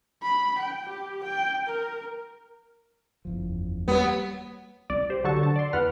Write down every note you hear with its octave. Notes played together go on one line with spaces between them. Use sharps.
B5
G5
G4
G5
A#4
F#1 E2 F3
F#3 G3 A#3 B3 B4
C2 D5
G4 C5
D3 F#3 F#4 A4 A5 C#6
D3 A5
D5 C6
E2 B4 F#5 F6